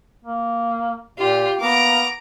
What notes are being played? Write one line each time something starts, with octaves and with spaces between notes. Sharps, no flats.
A#3
A#2 F4 G4
A#3 B3 A#5 D6